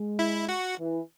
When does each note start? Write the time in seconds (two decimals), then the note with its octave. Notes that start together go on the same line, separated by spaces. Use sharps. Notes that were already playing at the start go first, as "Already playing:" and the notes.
Already playing: G#3
0.19 E4 E5
0.48 F#4 F#5
0.79 E3